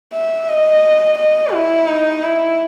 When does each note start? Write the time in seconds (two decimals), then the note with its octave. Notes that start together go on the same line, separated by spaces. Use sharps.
0.13 E5
0.49 D#5
1.18 D#5
1.53 E4
1.88 D#4
2.23 E4